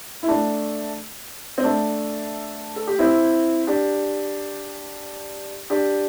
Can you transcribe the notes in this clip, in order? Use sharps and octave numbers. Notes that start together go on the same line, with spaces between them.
E4
A3 D4
C4
A3 D4
A4
G4
C4 E4
D4 G4
D4 G4